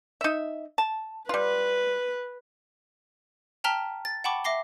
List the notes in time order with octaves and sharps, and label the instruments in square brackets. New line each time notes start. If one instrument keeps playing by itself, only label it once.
[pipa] D#4 E5
A5
[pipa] G3 F4 [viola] B4
[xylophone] G5 A5 A#5 F6 B6 G7
A6
F#5 G5 A5 B5 C#6 D6
E5 D6 A#6 C7 G7